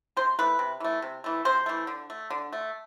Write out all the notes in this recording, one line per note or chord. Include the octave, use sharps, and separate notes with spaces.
C3 C5
E3 A3 B4
C3
E3 A3
C3
E3 A3
C3 C5
E3 A3
D3
A3
D3
A3